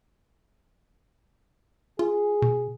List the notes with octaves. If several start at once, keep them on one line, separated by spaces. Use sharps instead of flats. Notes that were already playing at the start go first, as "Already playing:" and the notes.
F4 G#4
B2